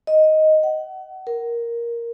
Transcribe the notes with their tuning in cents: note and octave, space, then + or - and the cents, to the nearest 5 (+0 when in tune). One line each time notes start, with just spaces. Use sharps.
D#5 +5
F#5 +30
A#4 +5